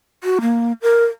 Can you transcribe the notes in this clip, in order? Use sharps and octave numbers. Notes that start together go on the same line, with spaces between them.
F#4
A#3
A#4